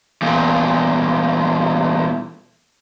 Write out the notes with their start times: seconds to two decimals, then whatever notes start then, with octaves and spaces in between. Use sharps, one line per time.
0.22 E2 A#2